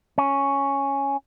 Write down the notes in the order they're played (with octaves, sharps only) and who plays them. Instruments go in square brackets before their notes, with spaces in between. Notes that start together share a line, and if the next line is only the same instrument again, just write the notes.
[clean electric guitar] C#4